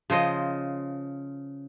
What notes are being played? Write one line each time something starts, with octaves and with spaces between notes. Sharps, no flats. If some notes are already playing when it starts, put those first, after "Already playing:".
C#3 F3 C5 D#5